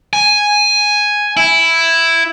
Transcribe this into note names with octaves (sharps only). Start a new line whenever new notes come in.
G#5
E4